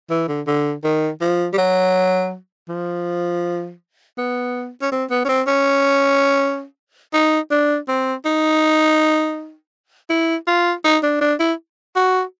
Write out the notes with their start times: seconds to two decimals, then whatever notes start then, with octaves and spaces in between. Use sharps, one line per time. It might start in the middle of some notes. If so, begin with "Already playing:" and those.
0.10 E3
0.28 D3
0.47 D3
0.84 D#3
1.21 F3
1.53 G3
1.58 F#3
2.69 F3
4.18 B3
4.82 C#4
4.92 C4
5.10 B3
5.25 C#4
5.29 C4
5.47 C#4
7.14 D#4
7.51 D4
7.88 C4
8.25 D#4
10.10 E4
10.47 F4
10.84 D#4
11.03 D4
11.21 D4
11.40 E4
11.96 F#4